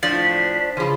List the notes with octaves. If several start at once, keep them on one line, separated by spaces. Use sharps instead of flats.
A2 F3 D4 B6
C5
C#3 E3 F3 G#4 B5 C6